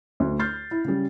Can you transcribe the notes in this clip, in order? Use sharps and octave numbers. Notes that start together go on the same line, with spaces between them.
D2
F6 G6 A6 C7
E4
C#3 G3